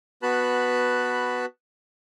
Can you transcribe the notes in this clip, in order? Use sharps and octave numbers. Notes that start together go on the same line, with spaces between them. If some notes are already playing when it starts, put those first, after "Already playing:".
B3 F#4 B4 A5 B5 F#6